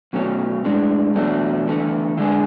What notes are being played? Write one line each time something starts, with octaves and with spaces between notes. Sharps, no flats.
B2 F#3 A3 C#4
A2 G#3 D4
E2 B2 F#3 A3 D4
E2 D3 A3
D3 G#3 D4 G#4